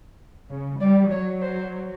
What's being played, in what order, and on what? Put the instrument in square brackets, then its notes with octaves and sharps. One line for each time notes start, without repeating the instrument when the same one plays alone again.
[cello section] C#3
[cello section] G3 [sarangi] D5
[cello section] F#3 [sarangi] C#5
[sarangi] C5